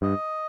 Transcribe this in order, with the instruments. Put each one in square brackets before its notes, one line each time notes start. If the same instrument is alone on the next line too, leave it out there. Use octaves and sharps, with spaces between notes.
[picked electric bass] G2 [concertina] D#5